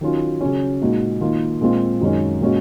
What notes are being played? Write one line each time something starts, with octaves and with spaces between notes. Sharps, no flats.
D#3 F#3 C#4 F4
C#3 F#3 C#4
A#2 G#3 D#4 F#4
D#3 A#3 F4
A#2 G#3 C4 F4
F#2 D#3 G#3 C#4
A#2 G#3 C#4 F#4